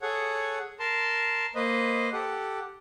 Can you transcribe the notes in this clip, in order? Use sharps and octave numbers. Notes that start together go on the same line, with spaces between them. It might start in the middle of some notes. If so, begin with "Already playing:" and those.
G#4 A4 C#5 F#5
A#4 A5 C6
A#3 B4 C5 D#5
G4 A4 F#5